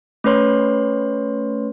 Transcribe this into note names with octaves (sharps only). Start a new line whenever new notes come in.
A3 C#4 B4 C#5 C6